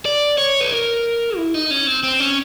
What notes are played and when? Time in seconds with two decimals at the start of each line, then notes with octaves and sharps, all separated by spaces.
0.05 D5
0.38 C#5
0.60 B4
0.72 A#4
1.37 E4
1.54 D#4
1.71 C#4
1.87 C4
2.03 C4
2.20 C#4